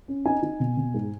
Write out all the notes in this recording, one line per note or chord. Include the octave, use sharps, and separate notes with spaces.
C#4
D#4 G#5
D#4
B2
B2
G#2